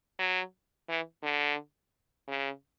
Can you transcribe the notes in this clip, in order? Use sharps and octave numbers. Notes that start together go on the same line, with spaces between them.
F#3
E3
D3
C#3